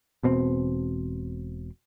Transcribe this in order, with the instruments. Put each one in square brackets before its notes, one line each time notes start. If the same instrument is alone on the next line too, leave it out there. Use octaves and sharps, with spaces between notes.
[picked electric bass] E1 B2 C4